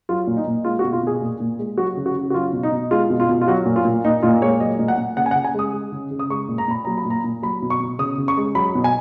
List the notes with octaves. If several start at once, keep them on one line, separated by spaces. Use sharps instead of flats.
F#3 F4
A#2
D#4
A#2
G#3 F4
F#4
B2
F4
B2 G#4
A#2
A#2
G#3
F#3 F#4
C#3
F#4
C#3
F#4
F#3 F4
B2
D#4
B2
G#3 F4
B2
F4
B2
F4
F#3 F#4
A#2
F4
A#2
A#2 D#4
A#2 F4
G#3 C#5
F#3 D#5
A#2
F#5
A#2
C#3 F#5
G#5
F#5
C#3
G#5
G#3 D#6
G#3
C#3
C#3
D#6
G#3 C#6
A#2
A#5
A#2 B5
F#3 A#5
B5
A#2
A#5
A#2
F#3 B5
B2
C#6
B2
C#3 D#6
C#3
C#6
G#3
F#3 B5
B2
G#5